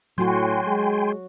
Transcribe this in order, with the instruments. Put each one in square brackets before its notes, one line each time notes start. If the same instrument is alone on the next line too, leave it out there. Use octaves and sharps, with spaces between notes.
[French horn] A2 [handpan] F#3 F#4 [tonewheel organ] G5 G#5 C6
[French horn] G#3